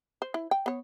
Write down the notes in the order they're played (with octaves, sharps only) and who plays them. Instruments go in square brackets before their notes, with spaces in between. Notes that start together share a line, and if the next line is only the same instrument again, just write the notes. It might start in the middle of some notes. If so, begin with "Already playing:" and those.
[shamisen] C5
E4
G5
B3 C#5